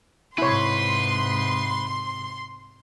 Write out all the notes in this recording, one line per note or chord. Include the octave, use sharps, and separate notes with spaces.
G#2 C3 E4 B4 C#5 C6